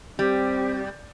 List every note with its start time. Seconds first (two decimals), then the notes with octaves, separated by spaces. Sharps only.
0.19 G3 C4 G4